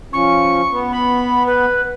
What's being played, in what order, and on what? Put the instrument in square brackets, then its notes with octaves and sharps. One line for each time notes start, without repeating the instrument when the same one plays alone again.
[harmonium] F3 C#4 [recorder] C#6
[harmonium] B3
[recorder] B5
B4